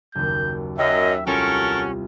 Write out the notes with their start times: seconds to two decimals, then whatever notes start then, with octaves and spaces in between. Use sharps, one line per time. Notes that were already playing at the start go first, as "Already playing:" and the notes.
0.15 F#1 D#2 G6
0.78 F#2 D#5 E5 G5
1.26 C2 C#4 F4 F#4 A4 A#4 B6